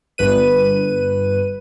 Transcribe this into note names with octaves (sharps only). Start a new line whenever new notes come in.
G1 B4 D#7